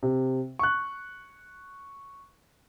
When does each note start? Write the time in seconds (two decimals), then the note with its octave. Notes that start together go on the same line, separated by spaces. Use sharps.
0.03 C3
0.59 C#6 F#6